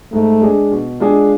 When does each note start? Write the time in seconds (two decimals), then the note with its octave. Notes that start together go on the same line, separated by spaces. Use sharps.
0.12 G#2 A3
0.41 G#3 D4 G#4
0.71 B2
1.00 G#3 D4 F4 G#4